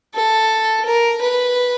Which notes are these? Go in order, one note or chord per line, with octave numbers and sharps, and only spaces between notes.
A4
A#4
B4